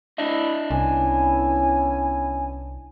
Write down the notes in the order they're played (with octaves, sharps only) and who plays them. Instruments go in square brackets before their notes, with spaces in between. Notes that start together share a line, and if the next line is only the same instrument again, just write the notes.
[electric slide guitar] D4 D#5 E5 [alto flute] E4
[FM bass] C2 [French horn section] B3 C#4 E4 [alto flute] G#5